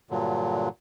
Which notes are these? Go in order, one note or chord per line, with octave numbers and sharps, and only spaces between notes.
G2 A#2 D3 F#3